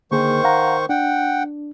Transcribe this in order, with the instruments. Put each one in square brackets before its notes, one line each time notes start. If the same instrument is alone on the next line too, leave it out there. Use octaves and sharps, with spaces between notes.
[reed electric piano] D3 A#3 G#4 [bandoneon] D#3 C5 C#6
[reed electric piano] F5 F#5 A#5
[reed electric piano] D4 [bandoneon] F#5 G5